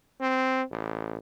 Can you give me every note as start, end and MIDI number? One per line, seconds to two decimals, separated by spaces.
0.21 0.63 60
0.71 1.17 33